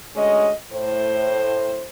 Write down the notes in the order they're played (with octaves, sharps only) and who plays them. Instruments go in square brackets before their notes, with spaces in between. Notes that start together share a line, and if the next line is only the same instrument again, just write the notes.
[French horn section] D2 G#3 C#4 D#5
A2 C5